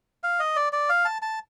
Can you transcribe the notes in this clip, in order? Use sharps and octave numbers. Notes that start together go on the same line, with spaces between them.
F5
D#5
D5
D5
F5
A5
A5